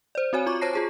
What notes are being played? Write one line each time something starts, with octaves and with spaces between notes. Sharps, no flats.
C5 D5
C4 F#4 C#5 G#5
F4 F#4 C#6 D6
C5 C#5 A5 A#6 C7
F4 G#4 A5